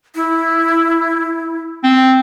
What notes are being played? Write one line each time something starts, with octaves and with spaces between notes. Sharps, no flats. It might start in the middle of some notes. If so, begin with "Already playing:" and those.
E4
C4